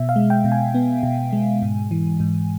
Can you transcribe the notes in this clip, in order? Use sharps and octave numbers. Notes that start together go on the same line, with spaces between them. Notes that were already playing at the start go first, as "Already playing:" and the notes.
Already playing: B2 E5
F5
G#3
G5
B2
G#5
B3
B2
G#3
G#2
E3
G#2